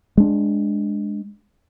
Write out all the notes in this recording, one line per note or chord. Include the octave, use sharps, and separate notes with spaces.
G#3 D4